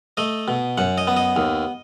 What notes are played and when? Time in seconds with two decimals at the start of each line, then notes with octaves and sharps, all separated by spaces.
0.17 A3 D#5
0.48 B2
0.78 F#2 F#5
0.98 D#5
1.07 B3
1.17 D#5
1.36 D#2